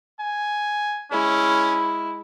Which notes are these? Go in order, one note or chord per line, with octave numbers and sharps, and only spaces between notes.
G#5
G#3 C#4 E4